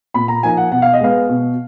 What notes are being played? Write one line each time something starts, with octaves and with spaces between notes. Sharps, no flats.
A#2 B5
A#5
F3 A#3 D#4 G#5
F#5
B2 F#5
F5
D#5
G#3 B3 F5
B2